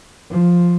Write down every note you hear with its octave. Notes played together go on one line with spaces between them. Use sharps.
F3